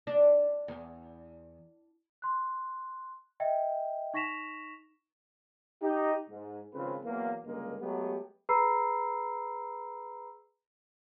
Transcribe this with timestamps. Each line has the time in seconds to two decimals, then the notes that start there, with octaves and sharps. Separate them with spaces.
0.07 D4
0.68 E2
2.22 C6 F#6
3.40 D#5 E5 G5
4.14 D#4 C#6 A#6 B6 E7 F7
5.82 D#4 G4
6.29 G#2
6.74 G#1 C#3 F3 C4 F4 B4
7.04 E2 E3 F#3 A#3
7.45 C#2 G2 D3 G#3 A#3
7.80 F#3 G#3 A3 B3 G4
8.49 G#4 B4 A#5 B5 E6 C7